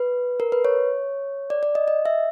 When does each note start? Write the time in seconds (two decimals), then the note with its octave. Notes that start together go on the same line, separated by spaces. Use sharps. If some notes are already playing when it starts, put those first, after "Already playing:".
Already playing: B4
0.40 A#4
0.52 B4
0.65 C#5
1.50 D5
1.63 D5
1.75 D#5
1.88 D#5
2.06 E5